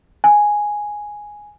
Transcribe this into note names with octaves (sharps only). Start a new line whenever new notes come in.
G#5